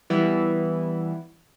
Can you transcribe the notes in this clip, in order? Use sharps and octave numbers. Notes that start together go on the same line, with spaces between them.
E3 G3 B3 E4